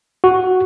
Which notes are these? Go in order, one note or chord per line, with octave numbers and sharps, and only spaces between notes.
F#4